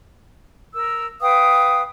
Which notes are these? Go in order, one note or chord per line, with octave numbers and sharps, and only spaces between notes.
A#4 E6
B4 F5 G5 D#6